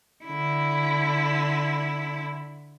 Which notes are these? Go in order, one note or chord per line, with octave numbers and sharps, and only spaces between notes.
D3 E4